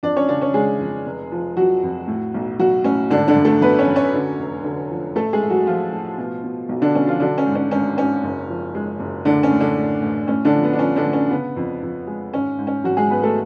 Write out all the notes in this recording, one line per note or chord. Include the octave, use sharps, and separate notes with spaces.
F2 D4 D5
C#4 C#5
C#3 D4 D5
C#4 C#5
C#3 G#3 G#4
F2
F1
F3
F3 F#3 F#4
F2
A2
B1
B1 F#3 F#4
A2 C#4
G#1 D3 D4
D3 D4
F#2
A3 A4
F#2 B3 B4
C#4 C#5
F#2
C#4 C#5
D3
F1
D3
F3
A1 A3 A4
G#3 G#4
A1
F#3 F#4
A1 F3 F4
A2
B2
B2
B1
D3 D4
B1 C#4
F3 F4
D3 F#3 D4
C#4
G#2
C#4
G#1 C#4
G#1 C#4
F#1
F3
G#3
F#1
A2 D3 D4
C#4
A2
D3 D4
A2
A1
A2 C#4
D3 D4
F3
B3
D4
F3 C#4
D3 D4
A2
C#4
C#3 B3
F2
F2
G#3
G#1 C#4
G#2
C#4
G#1 F#3 F#4
G#3 G#4
G#1 B3 B4
A3 A4